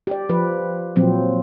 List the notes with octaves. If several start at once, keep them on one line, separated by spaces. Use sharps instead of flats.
G4 D5
F3 B4
A#2 F3 F#3 C4